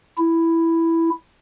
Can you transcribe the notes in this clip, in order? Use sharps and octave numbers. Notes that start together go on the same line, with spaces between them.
E4